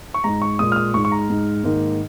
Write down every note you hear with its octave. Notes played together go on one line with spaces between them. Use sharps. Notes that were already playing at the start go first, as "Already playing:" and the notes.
C#6
G#2 G#3 A#5
C#6
A#2 G#3 D#6
F6
D#6
G#2 G#3 C#6
C#6
A#5
G#2 G#3
G#2 D#3 A#3